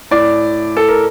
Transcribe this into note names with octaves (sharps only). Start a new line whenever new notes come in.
A2 D5
A4
A#4